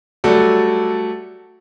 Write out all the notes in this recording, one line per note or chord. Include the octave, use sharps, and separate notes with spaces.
F#3 G3 A3 F#4 A4 D5